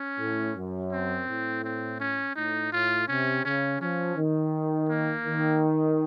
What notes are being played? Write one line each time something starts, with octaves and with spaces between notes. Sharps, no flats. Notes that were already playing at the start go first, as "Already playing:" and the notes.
Already playing: C#4
A2
F#2
C4
A2
C4
C#4
A2 D#4
A2 F4
C3 C#4
C#3 C#4
F3 C#4
D#3
A#3
D#3